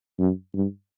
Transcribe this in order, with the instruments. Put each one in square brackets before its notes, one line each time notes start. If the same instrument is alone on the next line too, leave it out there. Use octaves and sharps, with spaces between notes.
[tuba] F#2
G2